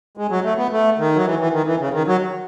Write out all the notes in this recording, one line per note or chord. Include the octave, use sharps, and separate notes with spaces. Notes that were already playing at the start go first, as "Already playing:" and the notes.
G#3
F#3
A3
B3
A3
D#3
F#3
E3
E3
D#3
E3
C#3
D#3
F#3